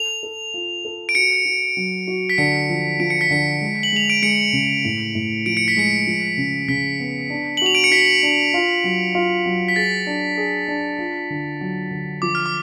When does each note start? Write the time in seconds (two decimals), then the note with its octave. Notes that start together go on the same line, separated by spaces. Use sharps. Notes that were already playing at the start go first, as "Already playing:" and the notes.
Already playing: A4 F7
0.23 A4
0.54 F4
0.85 A4
1.09 D7
1.15 F#4 C#7
1.45 F#4
1.77 F#3
2.07 F#4
2.30 B6
2.38 D3 C#7
2.70 F3
3.00 F3 D7
3.10 C#7
3.21 B6
3.31 D3 C#7
3.61 G#3
3.83 F#7
3.92 G#3 F7
4.10 D7
4.22 G#3 C#7
4.53 C#3
4.85 A2
5.15 A2
5.46 F3 D7
5.57 C#7
5.68 B6
5.77 G#3 C#7
6.07 F3
6.38 C#3
6.68 C#3 B6
7.00 B3
7.30 D4
7.57 F#7
7.62 F#4 F7
7.75 D7
7.84 C#7
7.91 F#4 B6
8.23 D4
8.54 F4
8.84 F#3
9.15 F4
9.46 F#3
9.68 B6
9.76 G#4 A6
10.07 D4
10.38 G#4
10.68 D4
10.99 F4
11.30 D3
11.61 F#3
11.91 D3
12.22 F3 D6
12.35 F6
12.46 D6